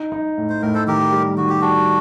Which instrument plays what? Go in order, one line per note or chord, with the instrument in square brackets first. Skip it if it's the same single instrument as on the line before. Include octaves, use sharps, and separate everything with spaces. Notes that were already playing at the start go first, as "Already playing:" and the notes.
Already playing: [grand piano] D#4
D#4
A2
[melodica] C5
[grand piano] A2 [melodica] A#4
[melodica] A4 C5
[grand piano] D#3 [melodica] G4 A#4
[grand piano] G3
[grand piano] D#3 [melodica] F#4
[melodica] G4
[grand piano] G3 [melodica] D4 F#4